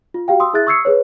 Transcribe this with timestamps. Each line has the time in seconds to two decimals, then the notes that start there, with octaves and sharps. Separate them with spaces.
0.14 F4
0.28 F#4 G4 F5 G5
0.40 C6 D#6 E6
0.53 E4 G#4 E5 F#6 A6
0.67 C#6 D#6 E6 G#6 C7 C#7
0.85 G#4 B4 C#5